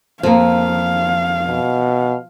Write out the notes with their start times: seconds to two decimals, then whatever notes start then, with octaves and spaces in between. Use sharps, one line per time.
0.23 F2 F3 A#3 F5
1.47 B2